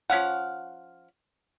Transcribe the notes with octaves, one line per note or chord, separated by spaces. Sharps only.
F3 C#4 F5 F#5